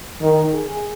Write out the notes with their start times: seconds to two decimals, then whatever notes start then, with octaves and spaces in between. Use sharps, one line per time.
0.21 D#3
0.54 G#4